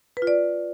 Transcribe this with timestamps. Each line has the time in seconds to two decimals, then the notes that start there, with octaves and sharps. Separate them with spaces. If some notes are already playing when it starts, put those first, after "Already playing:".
0.17 B4
0.22 F4
0.27 D5